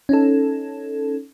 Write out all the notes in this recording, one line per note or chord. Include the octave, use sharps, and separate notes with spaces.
C#4 D#4 A4